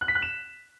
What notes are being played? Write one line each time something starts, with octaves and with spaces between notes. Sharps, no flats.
F#6
B6
F#6
E7